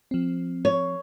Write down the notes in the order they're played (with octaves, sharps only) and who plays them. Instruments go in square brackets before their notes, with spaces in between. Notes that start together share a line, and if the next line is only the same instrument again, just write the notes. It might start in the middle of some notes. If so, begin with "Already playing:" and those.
[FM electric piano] F3 C4
[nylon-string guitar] C#5